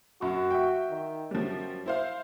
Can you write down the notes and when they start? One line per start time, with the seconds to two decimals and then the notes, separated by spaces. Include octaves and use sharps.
0.21 F#2 F#4 C#6
0.50 E5 G5
0.90 D#3
1.31 F#2 F3 G3
1.86 E4 C5 F5